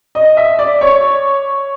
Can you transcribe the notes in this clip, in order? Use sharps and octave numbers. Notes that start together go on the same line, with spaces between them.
D#5
E5
D5
C#5